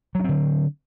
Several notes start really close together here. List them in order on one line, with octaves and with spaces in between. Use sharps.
F#3 D4 C4 D3